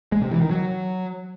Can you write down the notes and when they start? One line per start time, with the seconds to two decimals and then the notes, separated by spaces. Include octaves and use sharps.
0.12 G#3
0.22 C3
0.31 E3
0.41 D#3
0.50 F#3